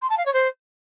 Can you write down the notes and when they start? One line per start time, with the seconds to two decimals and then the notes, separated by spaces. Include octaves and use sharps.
0.02 C6
0.10 A5
0.18 F5
0.25 C#5
0.33 C5